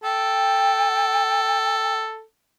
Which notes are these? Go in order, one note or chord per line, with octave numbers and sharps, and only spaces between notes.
A4 G5